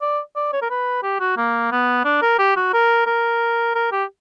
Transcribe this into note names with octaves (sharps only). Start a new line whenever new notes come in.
D5
D5
C#5
A#4
B4
G4
F#4
A#3
B3
D4
A#4
G4
F#4
A#4
A#4
A#4
G4